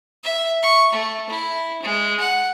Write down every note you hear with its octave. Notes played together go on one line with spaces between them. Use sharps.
E5
C#6
A3
E4
G#3
F#5